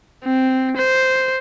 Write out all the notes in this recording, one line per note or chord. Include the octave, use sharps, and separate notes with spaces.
C4
C5